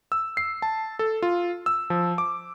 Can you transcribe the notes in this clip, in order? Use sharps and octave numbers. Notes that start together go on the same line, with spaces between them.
E6
C7
A5
A4
F4
E6
F3
D6